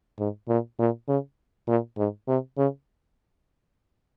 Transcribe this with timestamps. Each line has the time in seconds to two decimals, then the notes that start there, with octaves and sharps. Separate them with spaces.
0.19 G#2
0.48 A#2
0.79 A#2
1.08 C#3
1.68 A#2
1.97 G#2
2.28 C3
2.57 C#3